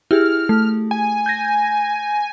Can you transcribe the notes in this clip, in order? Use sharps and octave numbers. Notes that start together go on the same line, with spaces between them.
E4 G4 G#4 F6
A3
G#5
G6 G#6 A#6